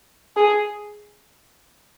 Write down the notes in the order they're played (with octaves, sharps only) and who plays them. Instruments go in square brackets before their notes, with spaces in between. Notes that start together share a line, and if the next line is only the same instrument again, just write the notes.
[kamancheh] G#4